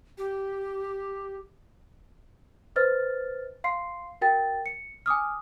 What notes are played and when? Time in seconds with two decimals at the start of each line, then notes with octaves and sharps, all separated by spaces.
0.18 G4
2.76 B4 C5 D#5 F6 A6
3.64 F5 C6 C7
4.21 F#4 A#4 G5 A6
4.66 C#7
5.06 G#5 D6 D#6 F6